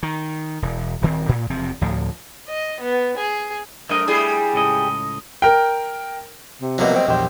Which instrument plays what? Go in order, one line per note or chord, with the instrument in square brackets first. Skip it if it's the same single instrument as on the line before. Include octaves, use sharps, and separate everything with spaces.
[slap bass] D#3
E1
D#1 D#3 C4
A2
E1 C3 F3 C4
D2 A2 F3
[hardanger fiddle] D#5
B3
G#4
[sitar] F#2 A#4 [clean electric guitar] A3 D#5
[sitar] G3 E4 G#4
[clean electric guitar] C#2 A2 D#5
[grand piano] A#4 G5
[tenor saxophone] C3
[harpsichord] C2 B2 F#3 [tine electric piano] F3 A#3 B3 [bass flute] D#5
[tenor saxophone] C4
[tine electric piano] A#1 E2 C5 [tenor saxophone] G4